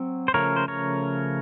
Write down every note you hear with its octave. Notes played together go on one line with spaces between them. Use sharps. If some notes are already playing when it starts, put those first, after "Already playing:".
Already playing: F#3 C4
C5
C#3 F3 A3 C#4 A#4 C#5
C5
A#4 C#5